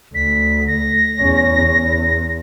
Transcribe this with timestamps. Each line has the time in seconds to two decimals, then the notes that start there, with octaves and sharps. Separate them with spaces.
0.15 D2 B6
0.67 A#6
1.19 E2 C#4
1.61 E2